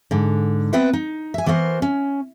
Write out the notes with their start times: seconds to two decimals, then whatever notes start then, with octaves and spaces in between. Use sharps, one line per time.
0.11 G#2 D3
0.73 B3 C4 B4 E5 F#5 G5
0.93 D#4
1.34 E5 G#5
1.46 E3 B3 F#4 A#4 C5
1.82 C#4